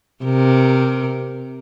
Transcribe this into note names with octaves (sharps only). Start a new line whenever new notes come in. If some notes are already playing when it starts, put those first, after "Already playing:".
C3 A#4